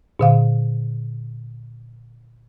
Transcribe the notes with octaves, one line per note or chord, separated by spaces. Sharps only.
A#2 D3 F5